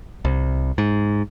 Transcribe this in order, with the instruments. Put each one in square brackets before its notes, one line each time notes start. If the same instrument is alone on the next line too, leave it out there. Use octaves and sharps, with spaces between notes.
[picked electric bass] C2
G#2